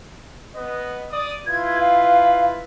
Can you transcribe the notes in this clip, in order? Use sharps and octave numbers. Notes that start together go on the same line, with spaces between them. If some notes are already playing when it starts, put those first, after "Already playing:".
B3 D#5
D5 D#6
E4 F4 B4 G#6
F5